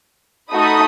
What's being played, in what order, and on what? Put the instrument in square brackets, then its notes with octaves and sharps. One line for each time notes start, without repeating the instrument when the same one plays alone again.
[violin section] A3 D#4 F#4 A4 B5 D#6